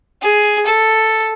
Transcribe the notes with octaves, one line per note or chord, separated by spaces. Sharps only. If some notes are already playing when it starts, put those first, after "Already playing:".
G#4
A4